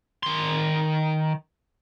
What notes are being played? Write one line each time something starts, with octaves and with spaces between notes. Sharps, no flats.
D#3 C6